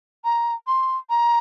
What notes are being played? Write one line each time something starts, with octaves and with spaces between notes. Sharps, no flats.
A#5
C6
A#5